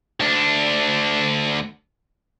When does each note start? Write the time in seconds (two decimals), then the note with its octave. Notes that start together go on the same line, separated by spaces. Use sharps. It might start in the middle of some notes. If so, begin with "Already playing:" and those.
0.20 D2 D4